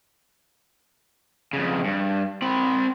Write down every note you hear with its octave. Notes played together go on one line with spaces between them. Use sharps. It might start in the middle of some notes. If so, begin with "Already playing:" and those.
F2 C#3
G2
C4 B5